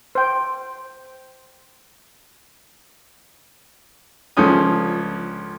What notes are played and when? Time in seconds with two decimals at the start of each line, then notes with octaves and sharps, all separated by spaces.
0.15 C5 G5
4.37 C#2 D3 F3 C#4 D#6